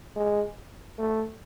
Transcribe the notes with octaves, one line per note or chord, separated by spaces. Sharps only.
G#3
A3